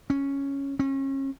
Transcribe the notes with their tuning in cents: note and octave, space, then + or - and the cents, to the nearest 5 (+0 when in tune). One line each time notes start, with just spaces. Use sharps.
C#4 +0
C#4 -35